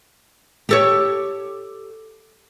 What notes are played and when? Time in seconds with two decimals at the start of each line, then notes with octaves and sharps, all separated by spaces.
0.69 G4 A4 C#5